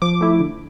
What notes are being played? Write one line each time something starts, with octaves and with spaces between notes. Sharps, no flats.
F3 D6
A3 E4
D3